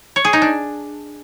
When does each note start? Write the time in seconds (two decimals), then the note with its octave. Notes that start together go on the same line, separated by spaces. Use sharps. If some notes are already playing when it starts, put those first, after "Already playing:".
0.16 C#5
0.25 G#4
0.33 D#4
0.42 D4